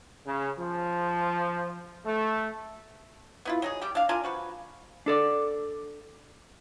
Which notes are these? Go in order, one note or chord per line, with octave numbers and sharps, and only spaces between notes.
C#3
F3
A3
B3 E4 F4
F#3 D#4 G#4
G3 G4
D4 F5
D4 F4 A#4 G#5
F3 F#4 B4
D4 A4 D5